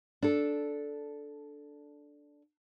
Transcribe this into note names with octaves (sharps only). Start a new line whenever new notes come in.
D4 A4